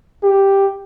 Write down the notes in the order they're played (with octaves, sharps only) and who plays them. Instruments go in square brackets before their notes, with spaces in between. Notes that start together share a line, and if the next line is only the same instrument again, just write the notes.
[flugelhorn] G4